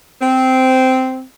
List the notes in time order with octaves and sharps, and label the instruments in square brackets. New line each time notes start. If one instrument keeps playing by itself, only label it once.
[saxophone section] C4